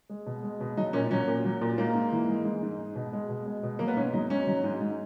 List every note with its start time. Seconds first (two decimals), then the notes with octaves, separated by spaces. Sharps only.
0.09 G#3
0.26 B2
0.43 G#3
0.61 B2
0.77 F#3 D#4
0.93 A#2 C#4
1.11 F#3 C#4
1.28 A#2
1.44 F#3
1.61 A#2
1.78 G#2 A#3
1.95 G#2
2.12 E3
2.28 G#3
2.45 G#2
2.63 G#2
2.79 G#3
2.95 B2
3.13 G#3
3.29 B2
3.46 G#3
3.63 B2
3.79 F#3 A#3
3.88 B3
3.97 G#2 C#4
4.13 F#3 D#4
4.30 G#2 C#4
4.47 F#3
4.64 G#2
4.81 G#2